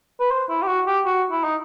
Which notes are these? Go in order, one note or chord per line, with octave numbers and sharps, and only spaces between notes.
B4
C5
E4
G4
F#4
G4
F#4
E4
D#4